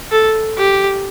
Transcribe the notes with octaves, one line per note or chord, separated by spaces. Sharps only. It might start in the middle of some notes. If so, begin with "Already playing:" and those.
A4
G4